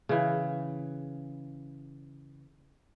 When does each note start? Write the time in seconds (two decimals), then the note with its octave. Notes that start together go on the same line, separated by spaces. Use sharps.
0.09 C#3 E3